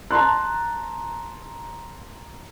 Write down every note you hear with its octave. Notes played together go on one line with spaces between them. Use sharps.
A5 A#5 C6 F#6